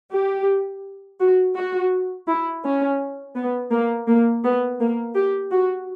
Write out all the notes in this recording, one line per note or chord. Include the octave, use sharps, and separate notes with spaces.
G4
F#4
F#4
E4
C#4
B3
A#3
A#3
B3
A#3
G4
F#4